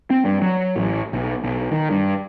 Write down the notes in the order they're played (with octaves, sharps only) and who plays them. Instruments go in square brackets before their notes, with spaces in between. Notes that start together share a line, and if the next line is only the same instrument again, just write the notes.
[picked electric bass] C4
G2
F#3
A1
B1
B1
D#3
G2